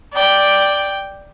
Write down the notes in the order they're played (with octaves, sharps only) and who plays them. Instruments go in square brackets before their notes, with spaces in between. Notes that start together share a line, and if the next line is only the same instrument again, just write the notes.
[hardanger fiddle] D5 G5